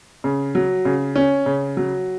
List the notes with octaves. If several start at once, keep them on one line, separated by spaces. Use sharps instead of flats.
C#3
F#3
C#3
C#4
C#3
F#3